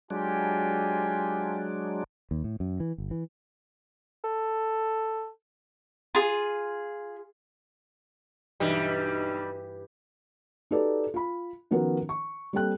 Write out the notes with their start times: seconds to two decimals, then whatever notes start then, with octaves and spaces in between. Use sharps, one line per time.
0.10 F#3 G#3 D4 F4 G4 G#5
2.31 D#2
2.44 A2
2.60 F#2
2.80 E3
2.98 G1
3.11 E3
4.24 A4
6.15 F4 G#4
8.60 B1 G2 E3 G3
10.71 D#4 F#4 G4 A4 B4 D5
11.14 F4 B5
11.71 D#3 F3 B3 C#4 F#4 A#4
12.09 C#6
12.53 G3 A#3 C4 A4 G5 F#6